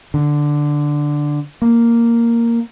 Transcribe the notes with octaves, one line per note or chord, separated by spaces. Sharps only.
D3
A#3